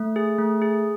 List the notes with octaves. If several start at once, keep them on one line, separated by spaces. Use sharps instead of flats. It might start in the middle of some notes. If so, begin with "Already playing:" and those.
Already playing: A3
G#4
A3
G#4